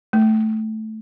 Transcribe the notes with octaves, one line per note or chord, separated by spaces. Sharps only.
A3